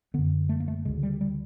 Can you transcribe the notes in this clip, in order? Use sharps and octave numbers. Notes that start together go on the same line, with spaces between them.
F#2 D3 B3
A3
A#3
A3
D2 C#3 G#3
G3
G3